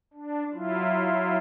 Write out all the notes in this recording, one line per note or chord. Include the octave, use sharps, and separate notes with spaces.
D4
F#3 E4 F4